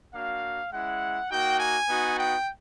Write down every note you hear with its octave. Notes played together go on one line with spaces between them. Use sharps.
A#3 D4 F#4 F5
G#3 C#4 E4 F#5
A#3 D#4 F#4 G5
G#5
B3 D#4 F#4
G5